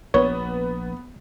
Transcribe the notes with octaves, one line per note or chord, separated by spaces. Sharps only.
A#1 B3 C#5